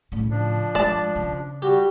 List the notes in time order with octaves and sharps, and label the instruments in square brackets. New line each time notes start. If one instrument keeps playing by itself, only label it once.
[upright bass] A2 C#3
[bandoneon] F3 D4
[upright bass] G2 G#3 [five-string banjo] D5 A5
[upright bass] C#3
[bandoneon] G3 F#4 [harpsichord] G4